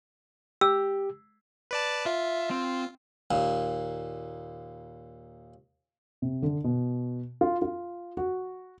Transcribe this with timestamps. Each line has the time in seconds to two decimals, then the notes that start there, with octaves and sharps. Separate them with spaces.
0.61 G4 E6
1.71 B4 D5 A5
2.06 F4 E5
2.51 C4
3.31 D#2 A#2
6.22 C3
6.42 D3
6.64 B2
7.41 F4
7.62 F4
8.17 F#4